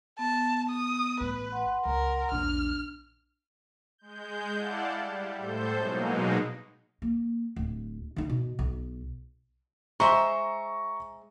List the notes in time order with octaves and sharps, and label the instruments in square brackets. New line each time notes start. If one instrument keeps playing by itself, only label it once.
[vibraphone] B3 [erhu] A5
[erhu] D#6
[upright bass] A1 A3 [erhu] B4
[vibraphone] F#5 C6
[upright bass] C#2 [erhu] A#4
[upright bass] A#1 E2 [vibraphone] D4 [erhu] F6
[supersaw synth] G#3 G6
E4 D5 F5 F#5 A5
G3
A2 A4 C5 G6
B2 F#3 G#3 A#3 D#4
[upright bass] A#3
D1
D#3 D#4
B2
B1
[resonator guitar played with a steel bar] G#3 C5 E5 [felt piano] A#5 C#6